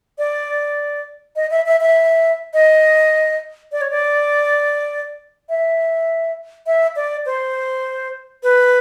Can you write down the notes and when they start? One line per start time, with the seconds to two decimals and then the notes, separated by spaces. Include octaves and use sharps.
0.18 D5
1.36 D#5
1.51 E5
1.66 E5
1.80 E5
2.54 D#5
3.72 D5
3.81 C#5
3.90 D5
5.49 E5
6.66 E5
6.96 D5
7.26 C5
8.43 B4